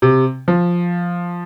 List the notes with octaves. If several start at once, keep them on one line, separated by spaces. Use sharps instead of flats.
C3
F3